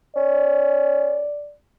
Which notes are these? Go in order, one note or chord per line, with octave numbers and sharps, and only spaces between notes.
C#4 D5